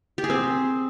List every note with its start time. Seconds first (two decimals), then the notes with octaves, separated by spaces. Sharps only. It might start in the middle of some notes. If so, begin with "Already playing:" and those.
0.18 G4
0.24 G#4
0.30 C4